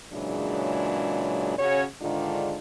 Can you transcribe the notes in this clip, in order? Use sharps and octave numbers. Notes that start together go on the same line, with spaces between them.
A#2 C#3 E3 F#3 G#3 D4
C#3 C#4 F#4 C#5
G#2 D3 D#3 G#3 D4 F4